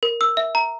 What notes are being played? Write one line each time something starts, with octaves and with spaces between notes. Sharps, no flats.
A#4
E6
E5
A#5